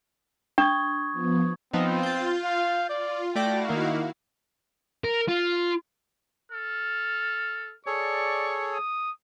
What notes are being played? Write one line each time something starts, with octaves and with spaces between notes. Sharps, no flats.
D4 C#6 D#6 G#6
F3 B3
F3 B3 C4 D#4 F4
G6 A6
F5
F4 D5
A3 E4 F#4 D5 F5 G5 A#6
D#3 A#3 D#4
A#4
F4
A4 F6
G#4 A4 C#5 D5 C#6
D#6